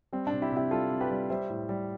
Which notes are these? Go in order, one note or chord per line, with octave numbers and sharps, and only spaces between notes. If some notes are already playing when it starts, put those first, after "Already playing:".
G3 C4
D4
C3
E4 G4
C3
E4 G4
G3 F4 A4
C3
G4 B4
G3
G3 C5 E5
A2
G3